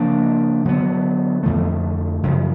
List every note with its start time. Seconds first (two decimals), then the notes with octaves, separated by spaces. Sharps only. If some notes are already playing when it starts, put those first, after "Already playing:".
Already playing: C#3 F3 A#3 D4
0.65 D3 F#3 B3
1.43 F2 D3 F3 A3
2.23 F#2 C#3 F3